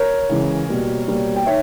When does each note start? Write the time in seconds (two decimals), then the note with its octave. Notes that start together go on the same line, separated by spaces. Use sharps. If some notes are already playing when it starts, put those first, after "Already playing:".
Already playing: A#4 C#5
0.29 C#3 E3 G#3
0.69 B2 G3 A#3
1.08 B2 G3 A#3
1.36 G5
1.46 D#3 C#5 E5